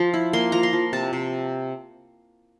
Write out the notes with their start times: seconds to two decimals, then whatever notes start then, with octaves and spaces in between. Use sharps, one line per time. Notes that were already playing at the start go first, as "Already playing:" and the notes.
Already playing: F3 C6
0.14 E4
0.33 A#3 C6
0.52 F3 A#5
0.63 C6
0.73 F3
0.93 C3 A5
1.13 C3